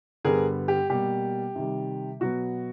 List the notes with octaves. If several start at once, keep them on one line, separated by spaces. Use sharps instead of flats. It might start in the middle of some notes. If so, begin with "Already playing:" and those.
G2 D3 G3 B3 G#4 A#4
G4
B2 G3 A#3 G4
C3 D#3 G3
B2 F#3 B3 F#4